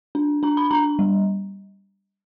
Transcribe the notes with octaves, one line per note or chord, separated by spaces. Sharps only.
D4
D4 A#5
B5
D4 A#5
G3